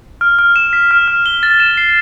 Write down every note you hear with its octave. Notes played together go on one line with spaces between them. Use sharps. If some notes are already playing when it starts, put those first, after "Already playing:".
F6
F6
E7
B6
F6
F6
G7
A6
E7
C7